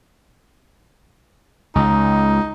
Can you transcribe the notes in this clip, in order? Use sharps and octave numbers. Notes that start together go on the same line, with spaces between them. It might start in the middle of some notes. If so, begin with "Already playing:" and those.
C#2 D#4